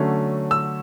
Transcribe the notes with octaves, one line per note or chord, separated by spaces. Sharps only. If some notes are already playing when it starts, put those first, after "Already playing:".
Already playing: D3 F#3 A3 C#4
E6